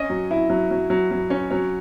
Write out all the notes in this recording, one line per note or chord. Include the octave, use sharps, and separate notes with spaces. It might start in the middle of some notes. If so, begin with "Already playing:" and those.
Already playing: C#4 D#5
F#3
E4
F#3
F#3
F#3
F#3
C#4
F#3 C#5